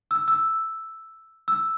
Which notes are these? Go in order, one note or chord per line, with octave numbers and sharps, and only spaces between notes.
E6
E6
E6